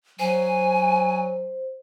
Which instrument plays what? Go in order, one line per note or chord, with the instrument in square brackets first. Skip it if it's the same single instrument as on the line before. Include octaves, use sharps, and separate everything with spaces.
[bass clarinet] F#3 [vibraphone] C5 [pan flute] G#5